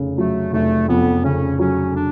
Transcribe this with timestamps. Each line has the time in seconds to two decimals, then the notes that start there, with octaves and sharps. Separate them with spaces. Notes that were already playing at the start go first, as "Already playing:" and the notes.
Already playing: F1 C#3
0.18 F#3 A3
0.53 F1 A3
0.88 F2 B3
1.24 C#3 C#4
1.59 F#3 C#4
1.95 D4